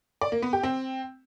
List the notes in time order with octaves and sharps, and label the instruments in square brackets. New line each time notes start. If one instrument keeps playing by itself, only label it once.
[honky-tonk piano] D5
A#3
B3
G4
C4